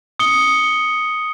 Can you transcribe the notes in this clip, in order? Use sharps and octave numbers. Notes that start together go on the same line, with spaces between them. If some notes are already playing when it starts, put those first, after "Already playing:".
D#6 C#7 G7